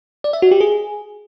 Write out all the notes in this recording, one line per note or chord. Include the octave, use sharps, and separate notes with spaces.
D5
E5
F#4
G4
G#4